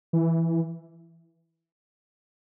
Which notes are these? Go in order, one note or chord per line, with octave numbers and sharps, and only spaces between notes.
E3